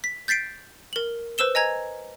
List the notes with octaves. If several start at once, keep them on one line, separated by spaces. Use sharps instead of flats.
B6
G6 A6 B6 C7 D7
A#4 F#7
B4 C5 E6 E7 G7
D#5 G#5 A#5 G#6